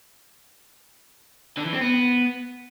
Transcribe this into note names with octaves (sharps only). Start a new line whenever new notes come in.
D3
E3
C4
B3